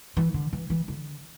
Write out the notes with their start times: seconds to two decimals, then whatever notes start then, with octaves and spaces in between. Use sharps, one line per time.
0.17 E3
0.34 D3
0.53 E3
0.70 E3
0.88 D3